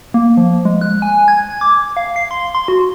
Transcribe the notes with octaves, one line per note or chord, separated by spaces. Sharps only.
A#3
F3
G#3
F#6
G#5
G#6
D6
F5
C7
C6
C6
F#4